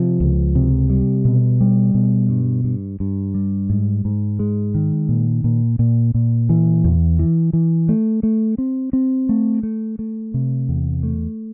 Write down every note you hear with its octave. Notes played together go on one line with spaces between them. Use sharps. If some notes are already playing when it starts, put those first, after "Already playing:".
Already playing: C3 F3
C#2
C3
G3
B2
G3
B2
G2
G2
G2
G3
G#2
G#2
G#3
D#3
A#2
A#2
A#2
A#2
E3
E2
E3
E3
A3
A3
C4
C4
A3
A3
A3
C3
E2
A3